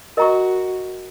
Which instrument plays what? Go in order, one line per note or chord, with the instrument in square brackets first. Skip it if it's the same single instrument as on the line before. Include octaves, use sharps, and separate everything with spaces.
[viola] F#4 [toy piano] A#4 D#5 A#5 C#6